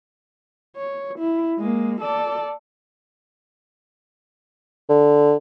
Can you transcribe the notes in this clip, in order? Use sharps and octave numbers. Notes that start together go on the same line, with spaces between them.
C#5
E4
G#3 A#3
A4 D5
D3